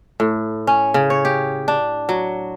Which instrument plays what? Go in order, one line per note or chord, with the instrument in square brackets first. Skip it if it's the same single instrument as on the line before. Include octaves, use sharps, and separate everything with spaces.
[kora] A2
C#4
C#3
C#5
G4
D4
F#3